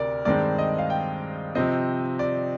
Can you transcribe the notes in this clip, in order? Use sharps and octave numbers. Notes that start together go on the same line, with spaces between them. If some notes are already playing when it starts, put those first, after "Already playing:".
Already playing: D2 C3 A#4 D5
G2 D#3 G#3 C4 D5
D#5
F5
G5
C3 F3 C4 D#5
D5